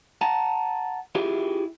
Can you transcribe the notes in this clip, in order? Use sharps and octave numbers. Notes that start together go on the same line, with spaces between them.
F#5 A5 A#5
E4 F4 G4 G#4 E5